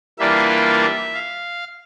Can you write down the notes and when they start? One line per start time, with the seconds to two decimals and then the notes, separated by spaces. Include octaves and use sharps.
0.18 E3 G3 A#3 D4 F4 E5
1.14 F5